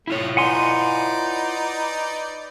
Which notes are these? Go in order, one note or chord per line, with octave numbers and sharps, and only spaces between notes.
A3 E4 F4 C#5
D#4 B4 D5 F#5 G#5 C6